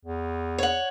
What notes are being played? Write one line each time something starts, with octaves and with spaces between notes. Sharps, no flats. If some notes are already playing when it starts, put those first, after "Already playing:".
E2
C#5 F#5